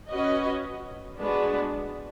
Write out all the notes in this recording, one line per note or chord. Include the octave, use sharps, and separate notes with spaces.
C#4 F#4 B4 D#5
G#3 B3 D4 F#4 B4